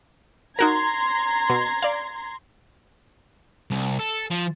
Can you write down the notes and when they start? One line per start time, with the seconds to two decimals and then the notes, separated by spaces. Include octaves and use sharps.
0.59 D#4 F#4 A#4 A#5 C6 G#6
1.50 B2
1.82 D5 F5
3.70 C2
3.99 A4
4.30 F3